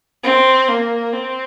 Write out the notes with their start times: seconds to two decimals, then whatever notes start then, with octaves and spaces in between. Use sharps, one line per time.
0.23 C4
0.68 A#3
1.13 C4